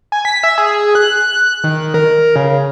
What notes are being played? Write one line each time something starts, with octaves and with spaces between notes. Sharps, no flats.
G#5
B6
E5
G#4
F#6
D#3
A#4
C#3